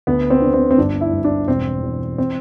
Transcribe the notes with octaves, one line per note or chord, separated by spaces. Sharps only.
D2 B3
C4
D3
C4
C4
G1 D4
E4
G2
D4
E1 C4
E2
C4